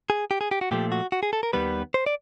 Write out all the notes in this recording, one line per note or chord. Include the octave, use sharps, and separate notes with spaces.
G#4
G4
G#4
G4
F#4
A#2 F3 A3 G4
F#4
F#4
G#4
A4
A#4
D#2 D#3 G3 B3 B4
C5
D5